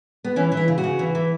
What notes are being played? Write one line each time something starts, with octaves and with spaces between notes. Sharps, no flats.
B3
E3 C#4
E3
E4
C#3
F#4
C#3
E3
E3